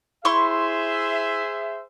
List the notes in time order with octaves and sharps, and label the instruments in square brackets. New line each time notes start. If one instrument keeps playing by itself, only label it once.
[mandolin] E4 C6 C#6 [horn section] G#4 C5 E5